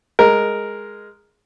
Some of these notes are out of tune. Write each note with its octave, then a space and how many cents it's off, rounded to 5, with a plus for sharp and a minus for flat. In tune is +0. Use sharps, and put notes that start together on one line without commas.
G#3 +0 A#4 +0